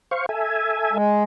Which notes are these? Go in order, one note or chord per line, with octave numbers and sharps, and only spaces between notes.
C5 F5 C#6
A4 E5 G#5
G#3